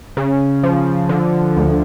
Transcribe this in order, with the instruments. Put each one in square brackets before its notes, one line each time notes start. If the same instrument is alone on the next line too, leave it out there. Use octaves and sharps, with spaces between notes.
[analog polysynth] C#3
F3
D3
D2